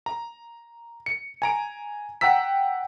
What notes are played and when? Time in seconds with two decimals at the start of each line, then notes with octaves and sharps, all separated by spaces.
0.06 A#5
1.06 C#7
1.42 G#5 A#5 D7
2.21 F#5 G5 A#5 E6 B6